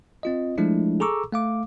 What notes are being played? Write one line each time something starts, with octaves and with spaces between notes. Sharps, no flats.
C4 F4 D#5
F3 G#3 A3 D4 E4
G#4 A4 A#5 C#6 D6 E6
A3 F5 D6